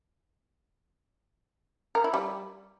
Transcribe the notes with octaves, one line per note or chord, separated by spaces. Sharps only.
A#4
E4
G3